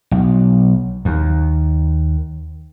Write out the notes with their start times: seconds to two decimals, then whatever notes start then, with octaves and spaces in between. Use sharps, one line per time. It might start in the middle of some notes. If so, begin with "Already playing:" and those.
0.11 B1
1.05 D#2